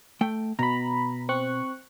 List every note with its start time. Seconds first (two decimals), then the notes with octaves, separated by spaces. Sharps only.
0.21 A3 G5
0.59 B2 A#5 B5
1.29 C4 C#6 F#6